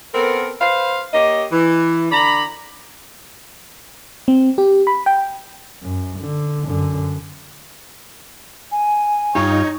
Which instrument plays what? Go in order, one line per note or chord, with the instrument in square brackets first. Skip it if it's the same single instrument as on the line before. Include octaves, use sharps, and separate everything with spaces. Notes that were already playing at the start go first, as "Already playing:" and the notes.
[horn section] B3 C4 A4 A#4
B4 C5 F5
A#3 G4 C#5 D#5
E3
D3 D5 A#5 B5
[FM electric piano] C4
G4
B5
G5
[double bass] F#2
D3
F#2 D3
[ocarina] G#5
[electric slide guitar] G2 F4 G4 [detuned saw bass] D#4 [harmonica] C#5